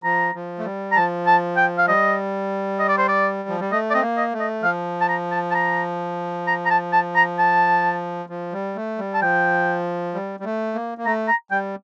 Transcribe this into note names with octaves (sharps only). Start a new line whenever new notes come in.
F3 A#5
F3
A3
G3
A#5
F3 A5
A5
G5
F5
G3 D#5
D#5
D5
C5
D5
F3
G3
A3 D#5
D5
C4 D#5
A#3
D#5
A3
D#5
F3 F5
A5
A#5
A5
A5
A#5
A#5
A#5
A5
A5
A#5
A5
F3
G3
A3
G3
A5
F3 G5
G3
G3
A3
A#3
A#3
A3 A#5
A#5
G3 G5